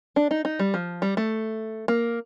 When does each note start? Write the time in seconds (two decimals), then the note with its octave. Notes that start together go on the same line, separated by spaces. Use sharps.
0.16 D4
0.31 D#4
0.45 D#4
0.59 G3
0.74 F3
1.02 G3
1.17 A3
1.88 A#3